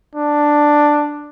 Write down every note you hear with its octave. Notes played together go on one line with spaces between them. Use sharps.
D4